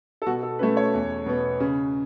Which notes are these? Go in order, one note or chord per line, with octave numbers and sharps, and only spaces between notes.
A4
B2 F#4
A4
A3 C#4 B4
C#5
E2
B2 B3
C#3